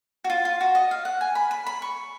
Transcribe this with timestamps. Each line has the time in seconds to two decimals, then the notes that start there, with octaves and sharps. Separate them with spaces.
0.24 F#4
0.30 F4
0.45 F4
0.61 F#4
0.75 D#5
0.91 F5
1.05 F#5
1.21 G#5
1.35 B5
1.51 B5
1.66 B5
1.82 C#6